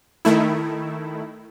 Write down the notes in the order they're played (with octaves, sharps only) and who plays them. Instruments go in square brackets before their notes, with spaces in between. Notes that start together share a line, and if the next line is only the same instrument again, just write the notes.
[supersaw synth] D#3 A3 E4